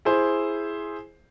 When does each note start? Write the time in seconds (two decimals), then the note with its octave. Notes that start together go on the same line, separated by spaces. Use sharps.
0.05 E4 G#4 C5